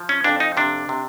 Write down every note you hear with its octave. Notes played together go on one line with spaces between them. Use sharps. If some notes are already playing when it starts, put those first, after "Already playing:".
Already playing: F3
C#4
F2 D4
D#4
C3 D4
C3